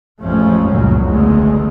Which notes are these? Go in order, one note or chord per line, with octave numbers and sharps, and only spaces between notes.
A1 F2 F3 G#3 A3 C#4
G1 C#2 F#2 A#2 F#3
F#1 E2 D3 G#3 A3